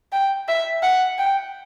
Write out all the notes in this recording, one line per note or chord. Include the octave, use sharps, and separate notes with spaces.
G5
E5
F#5
G5